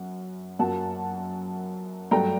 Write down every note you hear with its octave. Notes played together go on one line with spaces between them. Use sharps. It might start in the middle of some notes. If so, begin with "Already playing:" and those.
Already playing: F#2 F#5
F#2 F#3 A#3 F#5 A5
G2 F#3 A3 G5 A#5